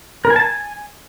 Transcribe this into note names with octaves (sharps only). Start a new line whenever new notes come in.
A#4
G#5
A5
G#5